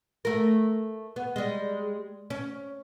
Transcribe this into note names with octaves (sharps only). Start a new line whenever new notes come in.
A3 A#4
B3
G3 G#3
C#4